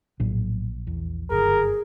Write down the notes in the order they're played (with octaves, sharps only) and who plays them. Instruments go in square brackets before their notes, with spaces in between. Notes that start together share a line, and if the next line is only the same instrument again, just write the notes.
[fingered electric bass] A#1 [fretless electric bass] A2 F#3 D4
[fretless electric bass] E2
[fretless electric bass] F#1 G2 D3 [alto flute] G#4 [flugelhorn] A#4